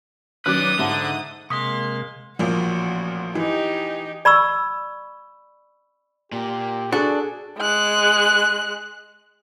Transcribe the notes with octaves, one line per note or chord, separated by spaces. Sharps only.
D#3 F#3 C#4 B4 D5 D6 D#6 F#6
G#2 D3 E5 F#5 A5
C3 G#3 A#3 F5 C6 C#6 D#6 B6
A1 A#2 F3 F#4
E3 D#4 G4
D5 B5 C#6 E6
A#2 G4
D4 F#4 G#4 A4
G#3 F#6